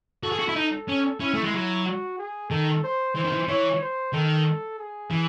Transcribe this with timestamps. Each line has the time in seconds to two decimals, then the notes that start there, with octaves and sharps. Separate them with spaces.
0.23 F#4 A4
0.32 G#4
0.39 F#4
0.48 E4
0.55 D#4 A4
0.88 C#4
1.20 C#4 E4
1.34 A3
1.43 G#3
1.54 F#3
1.86 F#4
2.18 G#4
2.51 D#3 A4
2.83 C5
3.16 E3 C5
3.25 D#3
3.32 E3
3.49 E3 C#5
3.81 C5
4.13 D#3 A4
4.78 G#4
5.11 E3